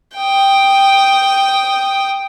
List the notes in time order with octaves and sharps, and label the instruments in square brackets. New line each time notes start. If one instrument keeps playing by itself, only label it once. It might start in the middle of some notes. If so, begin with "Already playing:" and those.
[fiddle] G5 D#6